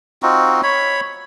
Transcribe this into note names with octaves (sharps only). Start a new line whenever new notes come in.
C4 D#4 F4 F#4
C#5 B5